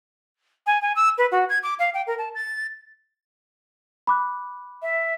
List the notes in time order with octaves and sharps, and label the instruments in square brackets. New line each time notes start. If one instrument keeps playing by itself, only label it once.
[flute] G#5
G#5
E6
B4
F#4
G#6
D6
F5
G5
A#4
A5
A6
[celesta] B5 D6 F#6
[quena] E5